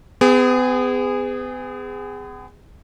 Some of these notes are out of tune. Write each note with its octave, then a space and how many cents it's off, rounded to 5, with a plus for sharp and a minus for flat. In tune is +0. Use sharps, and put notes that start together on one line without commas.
B3 +40 G#4 -20